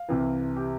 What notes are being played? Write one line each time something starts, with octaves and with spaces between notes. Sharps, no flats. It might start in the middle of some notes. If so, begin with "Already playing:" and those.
Already playing: F5
C2 C3 E3
G4